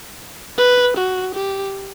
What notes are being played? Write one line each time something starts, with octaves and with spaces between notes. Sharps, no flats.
B4
F#4
G4